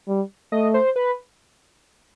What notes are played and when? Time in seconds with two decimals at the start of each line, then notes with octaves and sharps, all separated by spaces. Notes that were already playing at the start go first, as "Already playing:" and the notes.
0.08 G3
0.52 A3 D#5
0.74 C5
0.96 B4